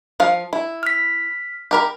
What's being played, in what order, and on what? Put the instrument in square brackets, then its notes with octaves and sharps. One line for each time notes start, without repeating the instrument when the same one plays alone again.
[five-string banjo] F3 F5
E4
[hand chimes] F6 B6
[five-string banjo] G4 A#4 B5